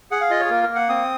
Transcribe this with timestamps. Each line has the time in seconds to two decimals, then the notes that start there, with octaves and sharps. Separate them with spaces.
0.11 G#4 F#5
0.21 F5
0.30 F4 D#5
0.40 C#5
0.45 G#4
0.50 A#3 A#4
0.63 A#4
0.69 A#3
0.75 F#5
0.89 C4 D#6